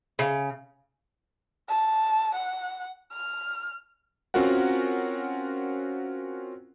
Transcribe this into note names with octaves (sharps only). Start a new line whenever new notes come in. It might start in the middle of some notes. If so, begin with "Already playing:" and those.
C#3
A5
F#5
F6
C4 C#4 F4 F#4 A#4 F#5